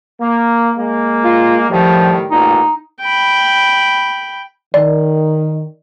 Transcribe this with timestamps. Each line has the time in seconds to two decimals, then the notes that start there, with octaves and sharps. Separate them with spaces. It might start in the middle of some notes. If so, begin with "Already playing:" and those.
0.21 A#3
0.78 G#3 A#3
1.24 F4
1.70 A2 D#3 F3 G3
2.31 A1 A#2 D#4
3.00 G5 B5
4.74 D#3 D5